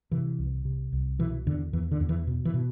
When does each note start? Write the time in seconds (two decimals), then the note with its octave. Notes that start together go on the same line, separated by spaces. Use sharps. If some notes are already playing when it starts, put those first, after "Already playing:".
0.12 C3 E3
0.39 C2
0.65 C3
0.93 C2
1.19 B2 E3
1.46 E2 D3
1.73 E2 E3
1.91 D3
2.00 E2
2.09 E3
2.27 B2
2.45 E3
2.54 B2